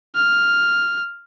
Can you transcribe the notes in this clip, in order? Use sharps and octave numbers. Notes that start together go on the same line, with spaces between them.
F6